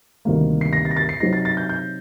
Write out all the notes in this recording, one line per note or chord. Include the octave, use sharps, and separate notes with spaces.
D2 C3 D#3 G3 A#3
C7
A#6
A6
A#6
A6
C7
C3 F#3 C4 D#4 A#6
A6
A6
G6
G6